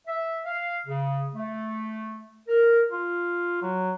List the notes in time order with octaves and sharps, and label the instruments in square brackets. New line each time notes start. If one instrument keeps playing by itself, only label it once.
[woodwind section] E5
F5
C#3
A3
A#4
[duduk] F4
F#3